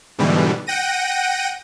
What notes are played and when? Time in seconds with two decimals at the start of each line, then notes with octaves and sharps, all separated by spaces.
0.18 G#2 B2 D3 E3 G3
0.67 F#5 G5 A#6 D#7